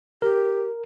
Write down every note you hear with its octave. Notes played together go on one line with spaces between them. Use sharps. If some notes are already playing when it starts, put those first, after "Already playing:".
G4 A#4